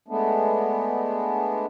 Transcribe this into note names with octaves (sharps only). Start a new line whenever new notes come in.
G#3 A3 B3 D4